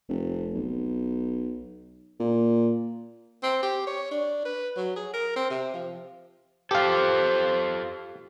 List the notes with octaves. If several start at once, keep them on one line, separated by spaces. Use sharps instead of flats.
F1
B1
A#2
C4
G4
C#5
D4
B4
F#3
G#4
A#4
C4
C3
F3
F4 G4 A4 C5 F5